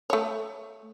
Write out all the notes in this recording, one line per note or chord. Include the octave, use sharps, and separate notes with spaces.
A3 C#5